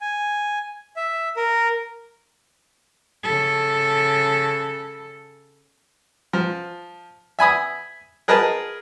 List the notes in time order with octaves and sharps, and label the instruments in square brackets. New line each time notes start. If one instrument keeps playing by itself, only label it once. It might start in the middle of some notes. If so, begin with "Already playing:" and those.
[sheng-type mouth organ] G#5
E5
A#4
[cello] C#3 A4
[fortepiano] F3
E5 G#5 B5 D#6
G#4 A#4 B4 D#5 A5